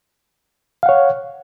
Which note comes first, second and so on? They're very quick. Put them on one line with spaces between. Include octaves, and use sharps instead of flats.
F5 F#5 C#5